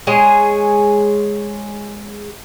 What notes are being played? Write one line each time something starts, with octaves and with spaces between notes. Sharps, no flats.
G#3 G#4 C#5